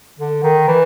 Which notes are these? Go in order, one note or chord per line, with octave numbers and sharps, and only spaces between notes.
D3
D#3
E3